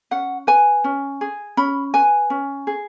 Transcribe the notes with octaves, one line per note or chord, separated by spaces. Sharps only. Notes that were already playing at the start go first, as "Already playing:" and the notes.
C#4 F#5
B4 G#5
C#4
G#4
C#4 B5
B4 G#5
C#4
G#4